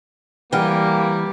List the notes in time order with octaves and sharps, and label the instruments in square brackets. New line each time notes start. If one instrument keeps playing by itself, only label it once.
[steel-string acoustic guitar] E3 [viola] G3 [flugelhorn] A#3 [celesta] F#5 G5 F6